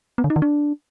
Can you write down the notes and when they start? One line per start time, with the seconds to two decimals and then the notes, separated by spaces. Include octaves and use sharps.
0.18 B3
0.24 D3
0.30 D#4
0.36 D#3
0.42 D4